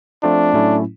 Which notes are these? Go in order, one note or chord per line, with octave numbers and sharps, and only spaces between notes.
F3 A3 C4 D4 F4
A2 F#3 A3 C#4 E4